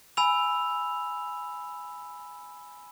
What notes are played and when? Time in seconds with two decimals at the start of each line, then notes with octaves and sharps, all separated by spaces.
0.17 G#5 B5 E6 F7